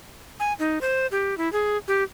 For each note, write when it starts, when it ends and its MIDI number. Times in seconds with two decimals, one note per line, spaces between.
0.40 0.53 80
0.59 0.79 63
0.81 1.07 72
1.11 1.37 67
1.38 1.51 64
1.53 1.77 68
1.88 2.03 67